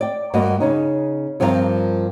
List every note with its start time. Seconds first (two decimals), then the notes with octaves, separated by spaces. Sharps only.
0.01 D5 G5
0.34 G2 A#3 F#4 D#5
0.60 C#3 C#4 D#4
1.40 G2 F3 C4 E4 A#4 F5